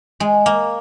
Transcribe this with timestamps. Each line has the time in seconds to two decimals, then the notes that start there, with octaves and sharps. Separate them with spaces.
0.20 G#3
0.46 A#3